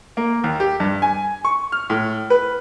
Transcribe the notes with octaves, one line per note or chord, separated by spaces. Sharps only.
A#3
D#2
G4
G2
G#5
C#6
F6
A2
B4